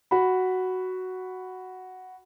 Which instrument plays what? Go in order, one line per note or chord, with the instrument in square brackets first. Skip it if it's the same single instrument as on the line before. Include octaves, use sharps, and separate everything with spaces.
[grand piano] F#4 B5